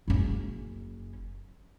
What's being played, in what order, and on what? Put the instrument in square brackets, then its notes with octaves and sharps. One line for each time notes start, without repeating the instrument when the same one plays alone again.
[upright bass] F#1 C#4